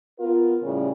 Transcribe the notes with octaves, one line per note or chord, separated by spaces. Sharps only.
B3 F4 A#4
A2 C#3 G3